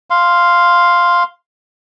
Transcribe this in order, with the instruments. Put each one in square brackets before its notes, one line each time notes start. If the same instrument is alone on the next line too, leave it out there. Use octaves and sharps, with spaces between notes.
[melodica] F5 C6